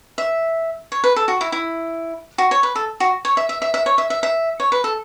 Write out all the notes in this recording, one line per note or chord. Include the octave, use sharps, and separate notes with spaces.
E5
C#5
B4
A4
F#4
E4
E4
F#4
C#5
B4
A4
F#4
C#5
E5
E5
E5
E5
C#5
E5
E5
E5
C#5
B4
A4